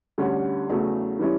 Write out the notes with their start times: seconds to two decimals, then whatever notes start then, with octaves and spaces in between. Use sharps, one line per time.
0.18 D2 D3 G3 C#4
0.69 E2 C#3 F#3 A3
1.19 E3 G3 C#4 E4